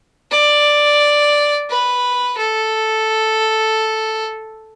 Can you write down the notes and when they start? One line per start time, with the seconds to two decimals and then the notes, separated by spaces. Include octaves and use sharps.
0.31 D5
1.70 B4
2.39 A4